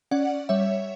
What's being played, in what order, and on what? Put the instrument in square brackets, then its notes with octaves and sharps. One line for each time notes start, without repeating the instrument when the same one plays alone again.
[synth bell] C#4 D5 F#5
G3 C#5 E5